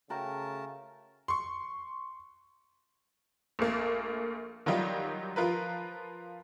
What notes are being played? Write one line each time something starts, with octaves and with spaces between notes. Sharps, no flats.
C#3 A3 F#4 A#4 G5 A5 A#5
C6 C#6
A#1 A3 A#3
D#3 F#3 G3 D#4 F4 G4
F3 F4 A#4 B4